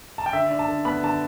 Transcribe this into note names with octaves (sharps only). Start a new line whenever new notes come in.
A5
G5
D3 E5
D4
A5
D3
B3 B5
D3 A5